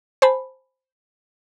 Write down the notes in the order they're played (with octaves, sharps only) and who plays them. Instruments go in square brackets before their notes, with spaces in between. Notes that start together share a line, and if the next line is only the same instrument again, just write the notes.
[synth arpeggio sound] C5 G#5 A5 B5